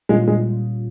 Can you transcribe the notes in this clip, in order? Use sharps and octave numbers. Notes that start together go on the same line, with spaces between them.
A#2 G3 G#3 C#4 F4
G#3